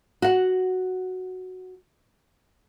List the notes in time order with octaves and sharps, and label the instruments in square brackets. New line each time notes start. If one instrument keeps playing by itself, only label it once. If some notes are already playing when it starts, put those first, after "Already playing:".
[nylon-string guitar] F#4 F#5